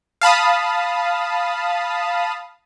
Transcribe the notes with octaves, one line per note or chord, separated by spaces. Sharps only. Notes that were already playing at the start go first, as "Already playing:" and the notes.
F5 A5 B5 D#6